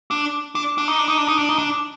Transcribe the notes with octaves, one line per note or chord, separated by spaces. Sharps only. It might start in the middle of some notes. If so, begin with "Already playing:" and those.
D4
D4
D4
D#4
D4
D#4
D4
D#4
D4
D#4
D4